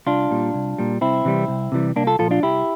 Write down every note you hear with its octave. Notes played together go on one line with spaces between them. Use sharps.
C2 D4 F4
A#2 G3
C2
A#2 G3
C2 C4 E4
C3 E3 G3
C2
C3 E3 G3
C2 A#3 D4
F4 A4
A#2 F3 F4 A4
D4 F4
C2 E4 G4